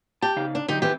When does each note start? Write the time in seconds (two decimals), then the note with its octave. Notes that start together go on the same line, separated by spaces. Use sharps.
0.22 G4 A5
0.36 C#3 D#4 F5
0.55 D4
0.68 D3 F#3 D#4 G4
0.82 D#3 E3 C4 E4 G4